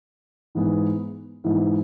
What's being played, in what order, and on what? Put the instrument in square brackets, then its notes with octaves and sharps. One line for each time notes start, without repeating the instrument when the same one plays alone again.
[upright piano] G#2 E3 G#3 B3
G#2 E3 G#3 B3 E4